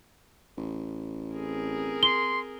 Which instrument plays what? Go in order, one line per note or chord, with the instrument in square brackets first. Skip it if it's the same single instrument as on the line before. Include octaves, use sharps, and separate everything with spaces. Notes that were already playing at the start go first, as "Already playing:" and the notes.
[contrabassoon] A1
[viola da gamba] C4 G#4 A#4
[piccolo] C6 [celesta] G7